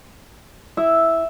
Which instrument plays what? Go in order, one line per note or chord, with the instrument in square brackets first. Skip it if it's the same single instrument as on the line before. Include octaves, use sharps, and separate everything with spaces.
[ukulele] E4 [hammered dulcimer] E5